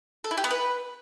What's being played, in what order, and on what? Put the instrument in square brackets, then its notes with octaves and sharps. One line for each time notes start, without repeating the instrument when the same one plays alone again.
[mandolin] A4
E4
G4
B3
B4